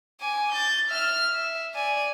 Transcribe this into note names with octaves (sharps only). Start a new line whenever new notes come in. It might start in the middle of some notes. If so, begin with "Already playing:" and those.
G#5 D6
G6 A6
E5 F6
E5
D5 G#5